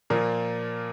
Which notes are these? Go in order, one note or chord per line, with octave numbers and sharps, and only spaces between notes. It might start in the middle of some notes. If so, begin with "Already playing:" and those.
A#2 F3 A#3